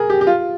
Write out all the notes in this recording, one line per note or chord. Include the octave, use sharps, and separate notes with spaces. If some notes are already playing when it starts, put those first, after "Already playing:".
Already playing: G#4 A#4
G4
G4
F4